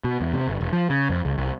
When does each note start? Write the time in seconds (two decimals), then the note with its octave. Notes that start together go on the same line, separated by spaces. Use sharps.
0.04 B2
0.21 E2
0.33 C3
0.48 G1
0.61 E1
0.73 F3
0.90 C#3
1.10 F2
1.25 C#2
1.38 C2